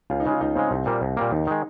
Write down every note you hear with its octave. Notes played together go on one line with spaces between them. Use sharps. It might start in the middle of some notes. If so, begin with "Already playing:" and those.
C#2 F4
D#4
C#3 G#3 F4
C#2 D#4
C#3 G#3 C4
C2
A#2 G3 A#3
C2
A#2 G3 A#3
D#2 D#4
D#3 G#3